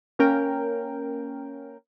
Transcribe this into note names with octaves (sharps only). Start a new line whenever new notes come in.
A#3 C#4 A#4 G5